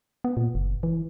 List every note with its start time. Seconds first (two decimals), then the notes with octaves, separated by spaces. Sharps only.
0.24 B3
0.37 A#2
0.55 F#1
0.83 E3